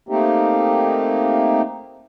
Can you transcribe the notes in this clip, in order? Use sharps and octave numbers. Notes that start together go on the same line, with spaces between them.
A3 A#3 C4 D#4 G4